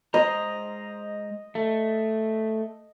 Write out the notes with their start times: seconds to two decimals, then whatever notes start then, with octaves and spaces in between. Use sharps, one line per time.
0.14 G#3 C5 D#5 A#5
1.55 A3